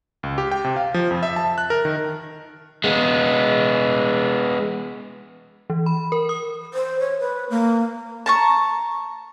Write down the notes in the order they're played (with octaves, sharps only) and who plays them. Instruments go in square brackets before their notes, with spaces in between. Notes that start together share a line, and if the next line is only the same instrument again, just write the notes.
[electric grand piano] C#2
G4
G5
C3
F5
F3
F2
E5
A5
F#6
A#4
D#3
[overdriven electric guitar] G#3 B3
[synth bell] E3
B5
A#4
D#6
[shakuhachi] C5
C#5
B4
A#3
[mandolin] A5 A#5 C#6